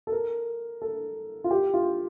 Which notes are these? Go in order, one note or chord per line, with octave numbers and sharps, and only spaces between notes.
A4
A#4
A4
F4
G4
F4